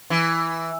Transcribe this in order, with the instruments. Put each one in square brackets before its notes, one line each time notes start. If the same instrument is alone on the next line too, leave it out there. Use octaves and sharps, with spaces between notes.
[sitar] E3